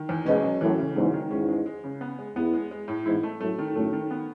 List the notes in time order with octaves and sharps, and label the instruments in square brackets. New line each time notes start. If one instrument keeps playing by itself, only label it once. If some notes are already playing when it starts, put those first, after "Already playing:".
Already playing: [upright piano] D#3
E2
[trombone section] G#2 B2 [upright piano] C#4
[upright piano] F#3
[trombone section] F#2 A2 [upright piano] E3
[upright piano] C#3
[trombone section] E2 G#2 [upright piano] F#3
[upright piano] D#3
[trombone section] E2 G#2 [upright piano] C#4
[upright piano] G#3
G#3
C#3
B3
G#3
[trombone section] E2 [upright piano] B3
[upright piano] G#3
G#3
A2
[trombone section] E2 G#2 [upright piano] E4
[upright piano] A3
[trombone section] F#2 A2 [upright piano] A3
[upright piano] D#3
[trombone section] F#2 A2 [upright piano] A3
[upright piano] D#3
B3